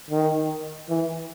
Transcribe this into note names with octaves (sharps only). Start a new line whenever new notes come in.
D#3
E3